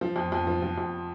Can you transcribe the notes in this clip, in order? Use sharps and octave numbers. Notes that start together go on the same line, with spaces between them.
F3
F2
F2
F3
F3
F2